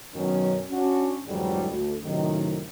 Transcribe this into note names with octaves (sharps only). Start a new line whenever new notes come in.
F#2 B2 D#3 F#3 C#4
C#4 D4 F#4
F2 G#2 D3 E3 F#3 G3
D2
F#2 A2 C3 D#3